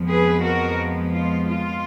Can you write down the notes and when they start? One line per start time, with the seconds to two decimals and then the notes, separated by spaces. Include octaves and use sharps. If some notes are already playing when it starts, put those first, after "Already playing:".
Already playing: F2 F3 G#3 B3
0.09 G#4 B4
0.43 F#4 A#4
1.13 F4
1.48 F4